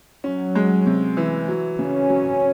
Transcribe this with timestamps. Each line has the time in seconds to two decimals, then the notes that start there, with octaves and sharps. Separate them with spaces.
0.24 F#3 C#4
0.55 G#3
0.86 C3
1.17 E3
1.48 F#3
1.79 C#3 C#4
2.10 F#3